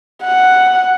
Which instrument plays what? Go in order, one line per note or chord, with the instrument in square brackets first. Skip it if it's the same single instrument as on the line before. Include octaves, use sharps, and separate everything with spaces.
[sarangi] F#5